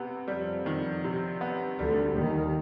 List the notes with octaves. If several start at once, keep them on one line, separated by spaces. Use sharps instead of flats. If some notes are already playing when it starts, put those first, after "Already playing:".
Already playing: C3 B3
F2 F3 G3
D#3
C3
B3
D2 D3 G3
D#2 D#3 G3